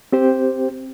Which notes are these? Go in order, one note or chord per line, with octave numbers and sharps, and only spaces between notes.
C4 G4 C5